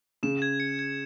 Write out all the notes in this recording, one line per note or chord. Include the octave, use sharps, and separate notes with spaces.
C#3 E7
G#6
C#7
G#6